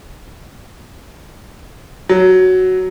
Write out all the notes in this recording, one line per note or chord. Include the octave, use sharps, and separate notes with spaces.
F#3